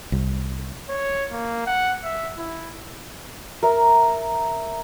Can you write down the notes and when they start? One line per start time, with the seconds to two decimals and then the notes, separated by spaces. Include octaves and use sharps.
0.12 C2
0.89 C#5
1.30 A#3
1.66 F#5
2.04 E5
2.37 E4
3.63 A#4 E5